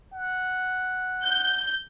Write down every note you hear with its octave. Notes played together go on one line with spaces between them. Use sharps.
F#5
G6